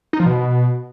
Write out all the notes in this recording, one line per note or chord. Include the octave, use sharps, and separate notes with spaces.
D#4
F3
B2